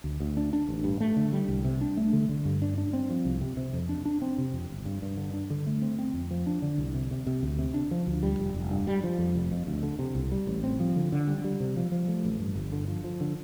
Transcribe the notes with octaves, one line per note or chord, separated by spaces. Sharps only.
D2
D2
D4
D4
A1
G2
A3
D3
G3
C2
C3
D4
A3
D3
D3
G2
D4
D4
C4
F3
C2
C3
C3
F2
D4
D4
C4
C3
F2
G1
G2
G2
D3
D4
D3
A3
C4
C4
F2
F3
D4
D3
C2
C3
C3
C3
D2
C3
D4
F3
D2
G3
F1
F1
G2
G3
F3
F2
F1
F2
D2
D3
C3
C2
G3
A1
C4
F3
D3
D3
G3
G3
C3
F3
F3
A3
A1
G2
G1
D3
F3
F3
D3